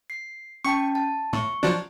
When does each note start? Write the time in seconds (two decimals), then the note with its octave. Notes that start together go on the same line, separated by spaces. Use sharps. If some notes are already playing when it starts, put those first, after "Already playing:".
0.10 C7
0.65 C#4 G5 A5 C#6
0.95 A5
1.33 A2 C#6
1.63 F3 F#3 D4